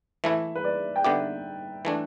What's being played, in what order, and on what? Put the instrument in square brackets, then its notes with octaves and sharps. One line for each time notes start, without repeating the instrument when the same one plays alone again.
[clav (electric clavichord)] E3 A3 E4 [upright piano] E5
[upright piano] B4
D5
G5
[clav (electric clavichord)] D3 B3 G4 [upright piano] E5
[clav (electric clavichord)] E3 A3 D4